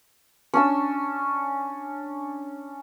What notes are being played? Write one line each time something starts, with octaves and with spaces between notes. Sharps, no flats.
C#4 D4 E6